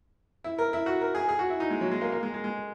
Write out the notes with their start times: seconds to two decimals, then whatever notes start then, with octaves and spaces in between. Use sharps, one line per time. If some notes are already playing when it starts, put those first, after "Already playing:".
0.44 E4
0.59 A#4
0.73 E4
0.86 F#4
1.01 A#4
1.15 G#4
1.29 G#4
1.39 F#4
1.50 E4
1.60 D#4
1.70 G#3
1.81 F#3
1.91 G#3
2.01 A#3
2.12 A#3
2.23 G#3
2.34 G#3
2.44 G#3